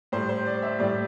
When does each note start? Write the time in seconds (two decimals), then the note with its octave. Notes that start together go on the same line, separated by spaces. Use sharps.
0.12 A2 G3 C5
0.29 C5
0.46 D5
0.62 E5
0.79 A2 G3 D5